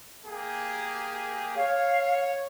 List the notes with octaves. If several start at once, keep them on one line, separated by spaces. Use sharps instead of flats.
A#3 G4 G#4
C#5 F5